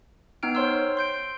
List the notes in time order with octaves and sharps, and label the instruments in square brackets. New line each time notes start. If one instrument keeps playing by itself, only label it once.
[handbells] B3 D#4 G5 F6 D7
C5 C#5 C6 E6
C6 G6 D7